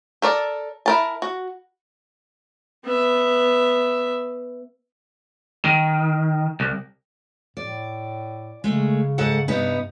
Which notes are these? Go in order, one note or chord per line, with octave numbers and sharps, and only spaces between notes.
A4 A#4 D5
E4 A#4 A5
F#4
B3 E5
D#3
C2
A2 D5
C#3 G#3 A3
G#2 A4 F#5
G2 C3 B3 D#4